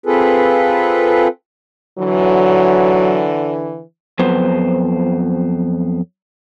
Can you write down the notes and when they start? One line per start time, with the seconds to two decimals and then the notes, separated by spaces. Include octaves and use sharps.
0.06 C4 F4 G#4 A4 B4
1.99 D3 E3 F#3
4.19 F2 F#3 B3 B4 C5